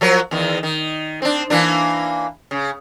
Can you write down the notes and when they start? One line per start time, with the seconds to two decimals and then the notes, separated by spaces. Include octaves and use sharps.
0.01 F3 F#3 A#4
0.31 E2 D#3
0.63 D#3
1.22 C4 D4
1.50 E3 A#3 D4
2.51 C#3